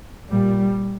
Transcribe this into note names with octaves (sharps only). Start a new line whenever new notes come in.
A#2 G3